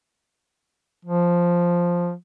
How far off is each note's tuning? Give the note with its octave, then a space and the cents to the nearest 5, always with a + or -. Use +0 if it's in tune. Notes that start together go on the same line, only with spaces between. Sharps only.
F3 +0